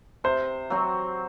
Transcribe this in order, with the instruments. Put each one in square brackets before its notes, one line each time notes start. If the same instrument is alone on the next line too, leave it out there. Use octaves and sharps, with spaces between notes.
[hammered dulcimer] C3 [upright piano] C5
[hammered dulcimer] F#3 C4 F#4